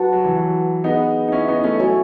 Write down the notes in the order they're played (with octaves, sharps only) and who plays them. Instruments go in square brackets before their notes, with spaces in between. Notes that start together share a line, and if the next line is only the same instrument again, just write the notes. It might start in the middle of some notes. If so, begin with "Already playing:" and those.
Already playing: [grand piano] F#3 [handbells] F#4 B4 F#5 A5
[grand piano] F#3
E3
F#3
[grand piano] B3 D#4 [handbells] G#4 B4 F#5
[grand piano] D#4
C#4 E4
B3 D#4
A3 C#4
[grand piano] F#3 A3 [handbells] F#4 C#5 E5 G#5